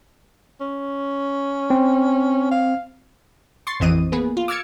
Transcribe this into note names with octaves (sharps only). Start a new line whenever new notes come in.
C#4
C4
F5
C6 C#6 A6 C7
A1 F2 E3 C4 D#5 D#7
A#3 B3 G#4 B4
F4
D6 E6 F6 G#6 A6 C#7